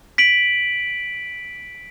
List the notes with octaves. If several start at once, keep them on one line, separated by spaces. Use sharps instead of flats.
B6 D7 F#7